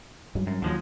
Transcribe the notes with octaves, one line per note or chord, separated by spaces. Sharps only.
G2 F#3 G#3
F#2
D#2 D3 F3 F#3 G#3